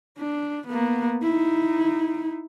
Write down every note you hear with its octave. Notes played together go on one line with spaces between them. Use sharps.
D4
A#3 B3
D#4 E4